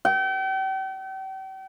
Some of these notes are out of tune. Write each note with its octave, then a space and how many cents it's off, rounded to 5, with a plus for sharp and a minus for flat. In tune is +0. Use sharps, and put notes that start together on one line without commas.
G5 -40